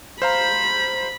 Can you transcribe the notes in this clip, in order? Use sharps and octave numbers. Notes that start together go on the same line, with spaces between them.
C5 F5 A#5 B5